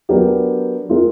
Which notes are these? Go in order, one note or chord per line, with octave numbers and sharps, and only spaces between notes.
F#3 B3 D4 G4 A#4
G#3 C4 F4 A#4